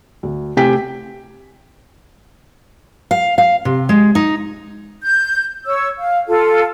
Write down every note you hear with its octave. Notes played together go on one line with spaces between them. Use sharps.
D2
C3 A3 G4 G5 G#5 B6
F5
F5
C3
G#3
D#4
G6
C#5 E6
F5
F4 A4